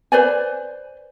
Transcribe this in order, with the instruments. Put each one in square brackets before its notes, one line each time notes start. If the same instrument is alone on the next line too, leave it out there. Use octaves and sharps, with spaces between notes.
[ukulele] B4 C5 D5 G#5